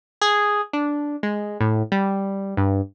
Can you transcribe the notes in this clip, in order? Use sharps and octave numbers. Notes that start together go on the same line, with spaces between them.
G#4
D4
G#3
A2
G3
G2